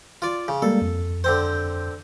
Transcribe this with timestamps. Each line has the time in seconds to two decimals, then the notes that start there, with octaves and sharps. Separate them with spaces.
0.22 F4 D5
0.48 C#3
0.62 G3 G#3 A#3 A4
0.82 F2
1.24 D3 C4 C5